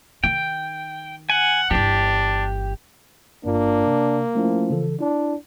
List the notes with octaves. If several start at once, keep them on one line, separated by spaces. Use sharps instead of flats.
D#3 D#4 G5
F#5 G#5
G1 E3 D4 G4
G1 G2 A#3 D4 F4
C3
F3 A3 C#4 E4
C#3 E3 A4
D4 E4